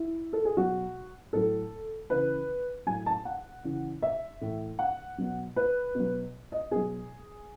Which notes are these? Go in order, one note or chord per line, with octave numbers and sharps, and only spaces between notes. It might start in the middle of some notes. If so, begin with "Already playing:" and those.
Already playing: E4
A4
G#4
B2 F#3 F#4
A2 F#3 A4
C#3 E3 B4
A2 F#3 G#5
A5
F#5
C#3 E3
E5
A2 E3
F#5
B2 F#3
B4
B2 F#3
D#5
B2 F#3 G#4